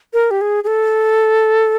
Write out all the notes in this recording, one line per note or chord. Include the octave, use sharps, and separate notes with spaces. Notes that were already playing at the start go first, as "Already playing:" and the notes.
A#4
G4
G#4
G#4
A4